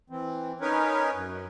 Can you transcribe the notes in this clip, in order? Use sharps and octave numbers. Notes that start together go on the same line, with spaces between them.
E3 C4
C#4 D#4 A#4 B4 C#5
F#2